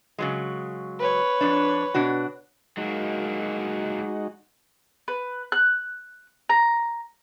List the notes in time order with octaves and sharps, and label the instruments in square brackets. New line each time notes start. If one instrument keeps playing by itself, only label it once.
[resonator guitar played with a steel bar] C#3 F#3 G#3
[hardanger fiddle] B4 C#5
[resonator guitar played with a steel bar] F2 G#2 D4
B2 D4 F#4
[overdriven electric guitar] F#3 A#3 [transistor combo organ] G#3 D#4 F#4
[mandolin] B4
F#6
A#5